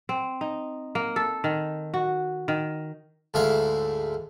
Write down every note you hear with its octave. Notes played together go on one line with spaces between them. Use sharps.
C4
D#4
A#3
A4
D#3
F#4
D#3
D2 G#2 E4 E5 F5